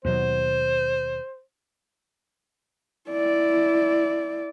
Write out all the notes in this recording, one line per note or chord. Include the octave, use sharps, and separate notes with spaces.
D#2 B2 F#3 C5
E4 D5